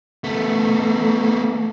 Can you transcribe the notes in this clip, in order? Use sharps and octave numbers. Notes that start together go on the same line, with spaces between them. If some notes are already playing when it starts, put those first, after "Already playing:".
A3 B3